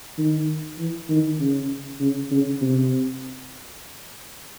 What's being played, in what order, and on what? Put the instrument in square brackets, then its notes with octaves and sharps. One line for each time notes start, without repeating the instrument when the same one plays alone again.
[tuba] D#3
E3
D#3
C#3
C#3
C#3
C3